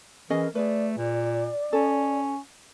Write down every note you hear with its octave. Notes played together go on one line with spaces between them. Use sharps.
E3 C#4 G#4 A#4 D#5
A3 G#4 B4 D5
A#2 D5
C#4 A4